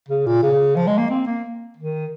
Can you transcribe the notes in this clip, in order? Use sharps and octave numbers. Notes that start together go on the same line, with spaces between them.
C#3
A#2
C#3
F3
G#3
A#3
C4
A#3
D#3